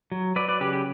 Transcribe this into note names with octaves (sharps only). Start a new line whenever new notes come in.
F#3
F#3 B4 D5
B4 D5
C#3 G4 B4
G4